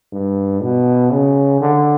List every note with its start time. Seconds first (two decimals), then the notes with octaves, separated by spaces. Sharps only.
0.13 G2
0.62 B2
1.12 C#3
1.61 D3